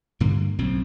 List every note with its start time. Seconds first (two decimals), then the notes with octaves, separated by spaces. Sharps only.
0.20 G2 D3 A#3
0.59 B1 F#2 A2 C4